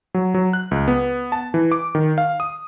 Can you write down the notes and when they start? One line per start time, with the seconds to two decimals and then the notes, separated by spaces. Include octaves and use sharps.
0.14 F#3
0.34 F#3
0.53 F#6
0.71 C#2
0.88 B3
1.32 A5
1.54 E3
1.72 D6
1.95 D#3
2.18 F5
2.40 D#6